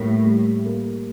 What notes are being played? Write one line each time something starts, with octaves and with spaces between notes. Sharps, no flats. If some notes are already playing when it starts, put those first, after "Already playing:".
Already playing: A2 G3 A#3
G3
A#3